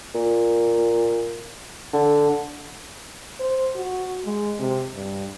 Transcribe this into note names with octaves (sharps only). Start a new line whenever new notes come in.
A#2
D3
C5
F#4
G#3
C3
G2